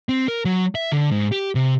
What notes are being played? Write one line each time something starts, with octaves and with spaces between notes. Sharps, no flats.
C4
A#4
F#3
E5
D3
G#2
G4
C3